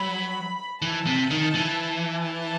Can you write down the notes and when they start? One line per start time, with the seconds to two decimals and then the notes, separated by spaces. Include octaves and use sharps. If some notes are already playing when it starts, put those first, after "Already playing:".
Already playing: F#3 B5
0.82 E3 A5
1.07 C3
1.31 D#3
1.55 E3
2.27 A5